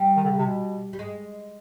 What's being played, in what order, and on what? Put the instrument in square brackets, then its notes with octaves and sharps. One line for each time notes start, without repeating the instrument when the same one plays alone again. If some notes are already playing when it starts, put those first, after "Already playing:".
Already playing: [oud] G3
[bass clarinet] D#3
D3
C#3
C3
B2
[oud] G3
G#3